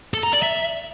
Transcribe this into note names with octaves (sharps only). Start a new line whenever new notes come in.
A4
A#5
D5
E5